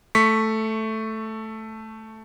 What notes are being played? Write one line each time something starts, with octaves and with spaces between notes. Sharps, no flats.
A3 C#6 B6